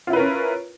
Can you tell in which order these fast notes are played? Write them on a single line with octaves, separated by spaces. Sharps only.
F4 E4 B4 A#4 C#4